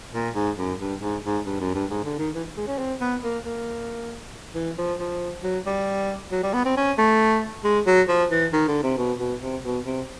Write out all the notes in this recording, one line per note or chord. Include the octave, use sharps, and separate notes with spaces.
A#2
G#2
F#2
G2
G#2
G#2
G2
F#2
G2
G#2
D3
D#3
E3
G#3
C#4
C4
B3
A#3
A#3
E3
F3
F3
F#3
G3
F#3
G3
B3
C4
C#4
A3
G#3
F#3
F3
E3
D#3
D3
C3
B2
B2
C3
B2
C3